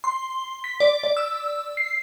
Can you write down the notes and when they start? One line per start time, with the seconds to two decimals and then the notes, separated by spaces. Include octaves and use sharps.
0.04 C6
0.64 B6
0.80 D5
1.03 D5
1.17 E6
1.77 C7